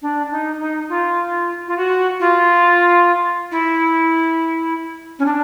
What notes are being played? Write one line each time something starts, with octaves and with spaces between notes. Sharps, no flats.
D4
D#4
D#4
F4
F4
F#4
F4
E4
C#4
D4